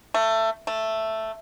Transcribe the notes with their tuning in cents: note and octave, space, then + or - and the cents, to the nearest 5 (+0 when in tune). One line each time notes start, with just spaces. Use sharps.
A3 +20
A3 +5